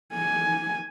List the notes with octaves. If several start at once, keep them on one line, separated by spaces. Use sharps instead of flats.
G#5